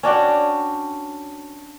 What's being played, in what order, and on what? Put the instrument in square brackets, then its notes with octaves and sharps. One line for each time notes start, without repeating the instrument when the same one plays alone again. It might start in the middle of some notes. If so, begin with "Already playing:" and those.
[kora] C#4 D4 F#4 G5